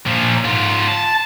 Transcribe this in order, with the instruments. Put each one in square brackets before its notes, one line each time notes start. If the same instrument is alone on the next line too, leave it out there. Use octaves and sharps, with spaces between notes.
[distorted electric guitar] A#2 F3
G#2 F4
A5